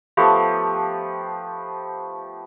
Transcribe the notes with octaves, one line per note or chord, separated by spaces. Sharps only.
F3 A3 B3 G4